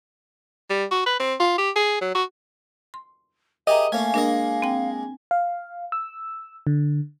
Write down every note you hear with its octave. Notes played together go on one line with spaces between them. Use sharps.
G3
F#4
B4
C4
F4
G4
G#4
F#3
F#4
C6
G4 G#4 A#4 D#5 E5 A#5
A3 A#3 C#4 F5 G#5
G#3 A#3 D4 A#4 D#5
C4 G5
F5
E6
D3